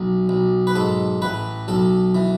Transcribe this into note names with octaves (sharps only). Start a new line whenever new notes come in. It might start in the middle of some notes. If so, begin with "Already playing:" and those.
Already playing: B1
B1
B4
G#2 A4
A1 B4
B1 A4
E3